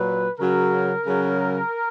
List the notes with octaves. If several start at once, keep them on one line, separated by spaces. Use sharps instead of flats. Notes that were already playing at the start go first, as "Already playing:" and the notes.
Already playing: A#2 F#3 B4
C#3 F#3 A#4
C#3 F#3